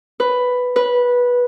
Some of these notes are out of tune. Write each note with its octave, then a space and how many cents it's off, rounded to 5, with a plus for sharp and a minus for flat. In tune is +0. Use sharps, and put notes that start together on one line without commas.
B4 +5
B4 -15